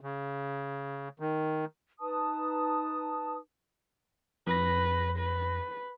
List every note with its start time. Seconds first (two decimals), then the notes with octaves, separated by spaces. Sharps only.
0.01 C#3
1.20 D#3
2.00 D#4 B4 A5 D#6
4.47 F2 B4 A#6
5.18 B4